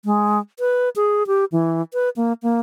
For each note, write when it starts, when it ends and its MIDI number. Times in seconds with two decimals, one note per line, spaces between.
0.05 0.39 56
0.59 0.89 71
0.96 1.27 68
1.27 1.45 67
1.52 1.82 52
1.93 2.09 71
2.16 2.33 58
2.43 2.60 58